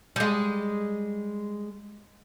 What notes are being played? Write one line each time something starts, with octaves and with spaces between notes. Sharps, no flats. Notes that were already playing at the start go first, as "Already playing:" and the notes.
G3 G#3